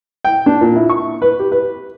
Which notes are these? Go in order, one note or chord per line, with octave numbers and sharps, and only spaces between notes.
G5
D4
A#2
E4
C#6
B4
G4
B4